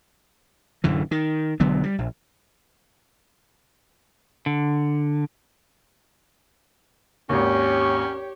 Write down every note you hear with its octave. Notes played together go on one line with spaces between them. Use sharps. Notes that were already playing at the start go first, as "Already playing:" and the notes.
D1 F#2 D3 E3
D#3
B1 D3 F#3 B3
G3
A#1
D3
G#1 D#2 C#4 G4 C#5